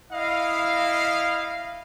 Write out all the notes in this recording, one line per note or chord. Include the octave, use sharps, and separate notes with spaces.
E4 D#5 F5